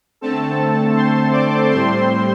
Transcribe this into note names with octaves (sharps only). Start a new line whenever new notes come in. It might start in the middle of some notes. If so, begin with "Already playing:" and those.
D3 A3 C4 A4 A5
C5 C6
D5 D6
A2 G3 C4 C5 C6